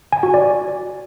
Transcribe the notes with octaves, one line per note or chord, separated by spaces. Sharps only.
G#5
F#4
D5